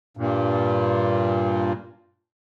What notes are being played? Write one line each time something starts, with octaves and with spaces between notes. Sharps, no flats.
G2 A#2